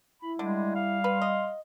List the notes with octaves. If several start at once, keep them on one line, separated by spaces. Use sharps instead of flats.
E4 B5
D3 G3 G#3
F5
B4 C6
D#5